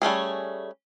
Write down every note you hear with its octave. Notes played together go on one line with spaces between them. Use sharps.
G3 A3 C#4 G#4